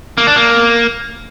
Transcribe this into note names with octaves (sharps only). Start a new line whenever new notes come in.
A#3
D4
A#3